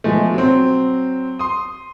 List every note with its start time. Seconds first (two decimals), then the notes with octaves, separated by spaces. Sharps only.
0.04 B2 F3 G#3 A3
0.34 F#3 C4
1.39 C6 D#6